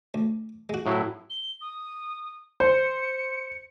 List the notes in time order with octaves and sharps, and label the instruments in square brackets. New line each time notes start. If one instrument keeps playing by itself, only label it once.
[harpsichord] D2
G#3 F#4
[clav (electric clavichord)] A2 F#3 E4
[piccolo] G7
D#6
[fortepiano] C5 [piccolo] C#7